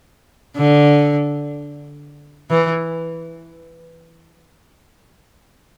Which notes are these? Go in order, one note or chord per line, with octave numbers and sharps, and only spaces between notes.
D3
E3